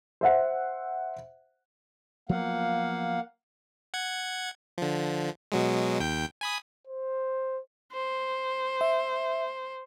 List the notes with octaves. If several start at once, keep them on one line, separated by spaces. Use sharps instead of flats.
C5 E5 F#5
F3 F#3 A#3 B3 F5 F#5
F#5 G#6
D3 F3
B2 F#3 G#3
D#2 G5 G6
G#5 B5 D#6
C5
C5
E5